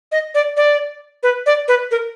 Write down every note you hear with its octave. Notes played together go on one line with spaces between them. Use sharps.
D#5
D5
D5
B4
D5
B4
A#4